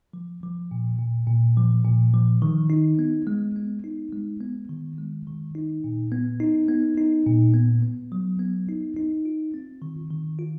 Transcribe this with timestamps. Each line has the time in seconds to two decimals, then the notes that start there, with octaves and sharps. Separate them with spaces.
0.13 F3
0.43 F3
0.71 A#2
0.99 A#2
1.27 A#2
1.57 F3
1.85 A#2
2.14 F3
2.42 D#3
2.70 D#4
2.99 B3
3.27 G#3
3.56 B3
3.84 D#4
4.13 G#3
4.41 B3
4.70 D#3
4.98 G#3
5.27 D#3
5.55 D#4
5.84 A#2
6.12 B3
6.40 D#4
6.68 B3
6.97 D#4
7.26 A#2
7.54 B3
7.82 B3
8.12 F#3
8.39 B3
8.68 D#4
8.97 D#4
9.25 F4
9.54 C4
9.82 D#3
10.11 D#3
10.39 F4